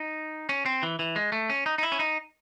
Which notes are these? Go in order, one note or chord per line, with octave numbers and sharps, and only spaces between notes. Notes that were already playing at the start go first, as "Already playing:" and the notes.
Already playing: D#4
C#4
C4
E3
E3
G#3
A3
C#4
D#4
D#4
E4
C#4
D#4